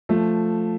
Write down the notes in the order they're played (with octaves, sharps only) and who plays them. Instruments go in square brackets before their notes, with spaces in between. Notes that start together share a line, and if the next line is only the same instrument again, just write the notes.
[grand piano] F3 A3